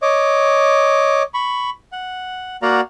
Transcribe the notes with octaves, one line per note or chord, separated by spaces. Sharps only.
C#5 D#5 D6
B5 C#6
F#5
A#3 F#4 D5 F5 F#5 A#5